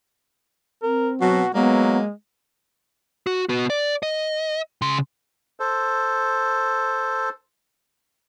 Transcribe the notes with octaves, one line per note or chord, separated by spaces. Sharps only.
C4 A#4
B2 F#3 F#4
F#3 G#3 A#3 B3
F#4
B3 F#4
D5
D#5
C#3 C6
A4 C5